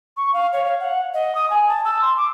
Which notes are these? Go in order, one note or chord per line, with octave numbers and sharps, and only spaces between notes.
C#6
F5
C#5
F5
F#5
D#5
D#6
G#5
A5
E6
C6
D6